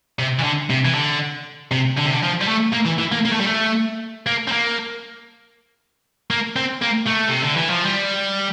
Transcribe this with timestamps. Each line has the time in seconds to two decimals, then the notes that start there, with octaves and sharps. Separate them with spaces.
0.19 C3
0.39 E3
0.43 D3
0.70 C3
0.85 E3
0.95 D3
1.71 C3
1.97 D3
2.05 C3
2.13 D3
2.23 F3
2.41 G3
2.48 A3
2.73 A#3
2.86 E3
2.99 E3
3.12 A#3
3.25 A#3
3.32 A3
3.40 G3
3.47 A3
4.26 A#3
4.47 C4
4.52 A#3
6.31 A#3
6.56 C4
6.82 A#3
7.07 A3
7.29 C3
7.42 D3
7.56 E3
7.70 F3
7.84 G3